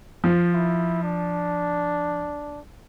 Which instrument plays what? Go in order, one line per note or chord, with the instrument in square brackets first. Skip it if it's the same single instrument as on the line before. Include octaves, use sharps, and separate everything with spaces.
[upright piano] F3
[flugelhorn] E4
D4